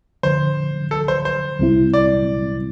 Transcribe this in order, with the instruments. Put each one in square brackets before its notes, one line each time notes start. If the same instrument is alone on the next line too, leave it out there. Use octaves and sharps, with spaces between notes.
[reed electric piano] F2 D3 F3 [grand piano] C5
[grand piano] A4
C5
C5
[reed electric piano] C2 C3 G3 C4 E4
[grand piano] D5